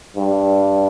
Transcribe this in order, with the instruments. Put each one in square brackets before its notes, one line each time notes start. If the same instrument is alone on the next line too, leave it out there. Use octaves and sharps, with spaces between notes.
[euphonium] G2